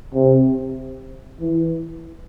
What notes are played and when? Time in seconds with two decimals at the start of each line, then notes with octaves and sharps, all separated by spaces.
0.15 C3
1.41 E3